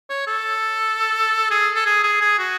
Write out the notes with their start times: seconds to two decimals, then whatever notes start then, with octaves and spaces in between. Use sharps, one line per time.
0.10 C#5
0.27 A4
1.50 G#4
1.75 A4
1.86 G#4
2.04 G#4
2.21 G#4
2.39 F#4